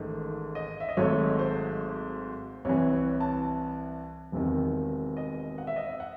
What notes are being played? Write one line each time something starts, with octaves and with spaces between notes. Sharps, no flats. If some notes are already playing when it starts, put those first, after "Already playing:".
Already playing: A1 G#2 D#3 A3
D#5
E5
D#5
G#1 G#2 F#3 A3 C#5
C5
C2 C3 E3 C#5
C#5
A5
E1 E2 C3 D#3
D#5
F#5
E5
D#5
E5
F#5